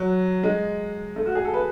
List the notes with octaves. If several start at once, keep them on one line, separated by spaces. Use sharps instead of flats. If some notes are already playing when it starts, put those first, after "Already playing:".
Already playing: F#3
G#3
A3
F#4
G#4
A4
B4